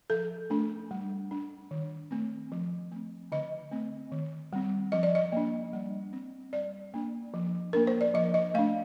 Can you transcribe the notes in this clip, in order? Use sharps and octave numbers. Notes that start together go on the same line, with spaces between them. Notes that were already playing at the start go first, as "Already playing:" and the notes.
F3 A4
A3 D4
G3
D4
D#3
A3 C4
F3
A3 C4
D3 D#5
A3 C4
D#3
G3 C4
F3 D#5
D5
D#5
A#3 D4
G3
C4
G3 D5
A#3 D4
F3
A#3 D4 A#4
C5
D5
F3 D#5
D#5
A3 D4 F5